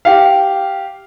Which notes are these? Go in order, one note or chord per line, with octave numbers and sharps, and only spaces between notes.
G4 F5